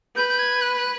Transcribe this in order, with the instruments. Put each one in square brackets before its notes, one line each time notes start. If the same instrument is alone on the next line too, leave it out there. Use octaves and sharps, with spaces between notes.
[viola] B4 [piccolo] G6
[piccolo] G6
G#6
F#6
F#6